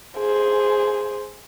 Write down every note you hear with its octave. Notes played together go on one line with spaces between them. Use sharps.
G#4 C5